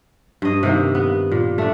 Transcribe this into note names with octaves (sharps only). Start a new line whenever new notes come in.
G2 D#5
C3 D#3 A#3
B3
A#2
A3 D4